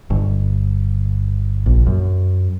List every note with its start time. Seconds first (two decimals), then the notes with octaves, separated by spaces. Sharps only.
0.10 G1
1.66 A#1
1.87 F#2